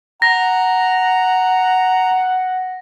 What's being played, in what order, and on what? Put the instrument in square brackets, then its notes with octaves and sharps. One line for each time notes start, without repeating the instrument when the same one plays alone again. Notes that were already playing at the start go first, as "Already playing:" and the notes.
[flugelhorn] F#5 [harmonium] A#5 [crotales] A#6